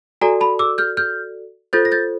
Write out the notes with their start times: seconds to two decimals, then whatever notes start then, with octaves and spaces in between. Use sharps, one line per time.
0.21 F#4 A4 D5 G#5 A#5
0.41 A5 B5
0.59 D6 E6
0.78 F6 G6
0.97 F6 G6
1.73 F4 A4 C5 G6 A6
1.85 A#6
1.92 G6 A6